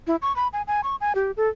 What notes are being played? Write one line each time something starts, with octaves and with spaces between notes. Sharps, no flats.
E4
C#6
B5
G#5
G#5
C#6
G#5
G4
A4